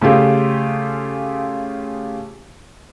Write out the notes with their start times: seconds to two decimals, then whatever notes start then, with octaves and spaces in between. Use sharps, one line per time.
0.01 C#3 A3 F4 G4 G#4